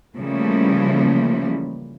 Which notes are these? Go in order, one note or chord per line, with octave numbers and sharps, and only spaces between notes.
C#3 E3 F3 G3 A3 A#3